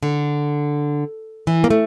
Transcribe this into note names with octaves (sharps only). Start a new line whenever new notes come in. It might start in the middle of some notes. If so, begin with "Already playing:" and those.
D3
E3
A#3
A3